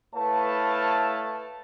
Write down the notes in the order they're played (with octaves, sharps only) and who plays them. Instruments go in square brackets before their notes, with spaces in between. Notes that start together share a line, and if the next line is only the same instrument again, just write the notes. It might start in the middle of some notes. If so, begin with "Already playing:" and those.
[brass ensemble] A3 E4 B4 C#5 F5 A5